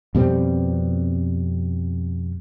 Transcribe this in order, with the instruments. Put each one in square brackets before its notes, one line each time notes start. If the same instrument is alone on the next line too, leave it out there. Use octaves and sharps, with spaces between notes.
[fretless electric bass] F2 B2 G3 C4